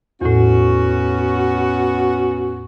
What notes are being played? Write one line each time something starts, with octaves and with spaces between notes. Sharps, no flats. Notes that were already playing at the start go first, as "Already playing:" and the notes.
E2 A2 B3 C#4 F#4